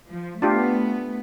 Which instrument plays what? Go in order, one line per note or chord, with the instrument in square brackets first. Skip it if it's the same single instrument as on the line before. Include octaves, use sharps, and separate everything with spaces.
[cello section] F3
[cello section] A3 B3 [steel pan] D4 F4 G4